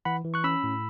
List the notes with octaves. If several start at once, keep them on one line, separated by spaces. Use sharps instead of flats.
E3 F#5 B5
E3
C#6 F#6
C#4 B5 E6
A2